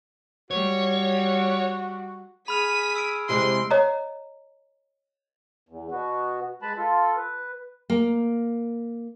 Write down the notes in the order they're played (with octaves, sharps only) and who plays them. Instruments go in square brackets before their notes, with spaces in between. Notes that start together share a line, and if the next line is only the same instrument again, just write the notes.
[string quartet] G3 [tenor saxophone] F#4 [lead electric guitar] C#5
[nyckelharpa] G#4 [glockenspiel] B5 F6 F7 [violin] B6 D#7
[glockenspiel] E6 D7
[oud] E2 C3 G#3 [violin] C6
[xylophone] C#5 D#5 A#5
[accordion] E2
B2 B3 F#4
G#3 B4 A5 B5
F4 A4
B4
[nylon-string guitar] A#3